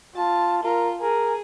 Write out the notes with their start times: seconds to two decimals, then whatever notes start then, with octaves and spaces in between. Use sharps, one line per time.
0.16 F4 A5
0.64 F4 A#4
1.01 G#4 A#4